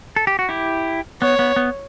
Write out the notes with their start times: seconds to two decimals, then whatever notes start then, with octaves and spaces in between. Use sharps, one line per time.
0.16 A4
0.27 G4
0.39 F#4
0.49 E4 G4
1.22 B3 C#5
1.39 B3
1.56 B3